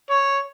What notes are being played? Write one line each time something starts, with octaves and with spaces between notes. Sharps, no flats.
C#5